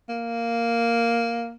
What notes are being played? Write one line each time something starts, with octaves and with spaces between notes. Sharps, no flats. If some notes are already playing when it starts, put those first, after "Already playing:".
A#3